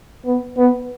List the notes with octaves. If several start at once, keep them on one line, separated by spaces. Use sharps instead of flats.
B3
B3